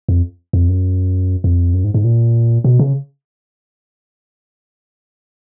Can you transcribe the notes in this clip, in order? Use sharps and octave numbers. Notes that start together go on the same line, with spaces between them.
F2
F2
F#2
F2
F#2
G#2
G#2
A#2
B2
C#3